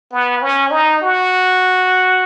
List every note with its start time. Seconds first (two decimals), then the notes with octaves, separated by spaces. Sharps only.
0.12 B3
0.42 C#4
0.71 D#4
1.02 F#4